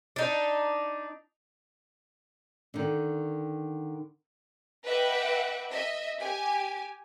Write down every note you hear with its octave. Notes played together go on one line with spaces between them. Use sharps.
D4 D#4
D3 D#3
B4 D#5 E5 F#5 G5 D6
D#5 E5
G4 G#5